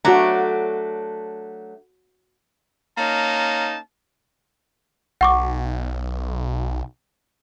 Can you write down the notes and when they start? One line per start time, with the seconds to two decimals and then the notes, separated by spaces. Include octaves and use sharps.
0.05 F#3 A3 D4 F#4 A#5
2.98 A#3 C#4 D#4 A5
5.21 B1 F#5 C#6 D6